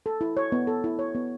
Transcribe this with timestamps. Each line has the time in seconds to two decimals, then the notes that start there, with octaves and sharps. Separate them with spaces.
0.06 A4
0.21 E4
0.37 C#5
0.52 B3
0.67 A4
0.84 E4
0.99 C#5
1.15 B3